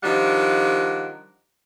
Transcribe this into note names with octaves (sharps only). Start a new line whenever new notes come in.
D#3 F3 G3 D4 F#5